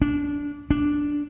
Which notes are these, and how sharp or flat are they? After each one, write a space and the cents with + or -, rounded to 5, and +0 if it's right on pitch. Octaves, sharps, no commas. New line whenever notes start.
D4 -20
D4 -5